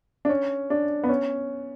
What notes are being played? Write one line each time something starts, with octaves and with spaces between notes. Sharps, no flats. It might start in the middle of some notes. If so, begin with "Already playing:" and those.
D4
C#4
D4
B3
C#4